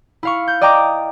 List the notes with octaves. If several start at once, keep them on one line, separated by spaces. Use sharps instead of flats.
E4 F5 C#6
G6
D5 D#5 G5 A#5 D6